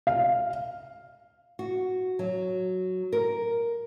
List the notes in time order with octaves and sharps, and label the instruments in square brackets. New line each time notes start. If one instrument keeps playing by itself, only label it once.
[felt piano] F5
[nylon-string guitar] F#4
F#3
A#4